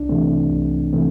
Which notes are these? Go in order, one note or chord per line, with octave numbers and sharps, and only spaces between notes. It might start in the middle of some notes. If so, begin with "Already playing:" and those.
Already playing: C2 D4
C3 E3 A3 C4
C2
C3 E3 A3 C4